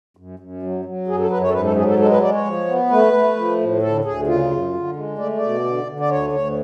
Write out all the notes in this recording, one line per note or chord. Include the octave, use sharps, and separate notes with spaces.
F#2
F#2
F#3
F#3
F#2 G#4
A4
F#2 B4
C#5
A4
G#2 B4
A4
F#3 G#4
A4
G#3 A4
B4
G#3 D5
C#5
F3
B3
A3 B4
A3
F3
A2
D2 A4
D2 G#4
C#3 F4
F#2
D3
G#3
A3 D5
B2 D5
D3
D3
D5
D2 C#5
D2 C#5